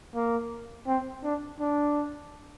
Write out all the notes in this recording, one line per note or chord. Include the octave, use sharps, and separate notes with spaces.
A#3
C4
D4
D4